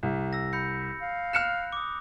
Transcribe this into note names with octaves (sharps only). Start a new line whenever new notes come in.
C2
E6 A#6
B5 G6 C#7
F5
F6 F#6 C#7 E7
D6 D#6